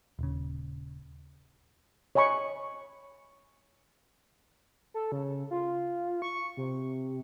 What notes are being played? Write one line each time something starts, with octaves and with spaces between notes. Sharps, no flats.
D#1 C#3
C#5 D#5 G#5 B5 C#6
A4
C#3
F4
C#6
C3